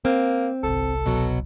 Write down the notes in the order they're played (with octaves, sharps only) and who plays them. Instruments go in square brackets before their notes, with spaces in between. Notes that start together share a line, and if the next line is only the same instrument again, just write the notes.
[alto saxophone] A#3 [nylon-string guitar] C4
[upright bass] G1 C2 [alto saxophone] A4
[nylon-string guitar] B2 F#3